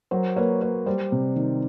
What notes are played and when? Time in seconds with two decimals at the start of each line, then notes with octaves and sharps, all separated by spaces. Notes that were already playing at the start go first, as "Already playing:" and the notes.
0.11 F#3 A#4 C5
0.36 A#3 B4 C#5
0.61 A#3 B4 C#5
0.86 G3 C5 D5
1.12 C3
1.36 D#3